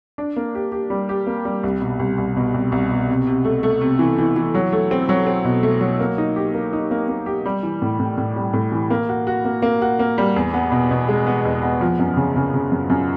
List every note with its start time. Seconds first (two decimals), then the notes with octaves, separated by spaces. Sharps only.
0.18 D4
0.36 A#3
0.55 G4
0.72 G4
0.90 G3
1.09 G4
1.27 A#3
1.45 G3
1.63 C2
1.81 B2
1.99 C2
2.18 C2
2.37 B2
2.54 C2
2.72 C2
2.91 B2
3.09 C3
3.27 C3
3.45 A3
3.63 A3
3.81 C3
3.99 E3
4.18 E3
4.36 E3
4.55 F#3
4.72 A3
4.91 C4
5.09 F#3
5.27 C4
5.45 B2
5.63 A3
5.81 F#3
5.99 A#3
6.18 D#4
6.36 G4
6.54 A#3
6.73 D#4
6.91 A#3
7.08 A#3
7.26 G4
7.46 G3
7.63 E3
7.82 A2
8.00 A2
8.18 A2
8.36 G3
8.53 A2
8.72 E3
8.90 A#3
9.09 F#4
9.27 F#4
9.45 A#3
9.62 A#3
9.82 F#4
9.99 A#3
10.18 G3
10.36 E2
10.54 B3
10.72 B2
10.91 B2
11.08 G#3
11.27 B3
11.45 E2
11.62 B3
11.81 F3
11.99 F#2
12.17 C#3
12.36 C#3
12.54 C#3
12.72 F#2
12.90 F#2